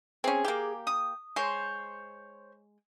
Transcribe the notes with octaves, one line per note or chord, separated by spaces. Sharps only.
C4 C#4 G#4
A#3 G4
D#6
G#3 C5 C#5